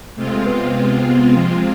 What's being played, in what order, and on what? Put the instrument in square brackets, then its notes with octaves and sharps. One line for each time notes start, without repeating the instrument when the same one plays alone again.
[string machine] C3 G#3 C4 F4 [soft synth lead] A3
[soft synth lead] B3
B3
B3
F3